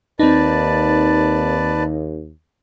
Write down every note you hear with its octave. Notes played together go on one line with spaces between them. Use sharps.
D#2 C4 D#4 B4 D5 A5